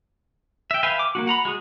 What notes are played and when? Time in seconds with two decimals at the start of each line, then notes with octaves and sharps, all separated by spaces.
0.71 E5 G5
0.83 B4 E5 F5 G5 G#5
0.99 D6
1.15 A#3 C#4 F#4
1.27 F#5 A#5 B5
1.45 G#3 F#4 G#4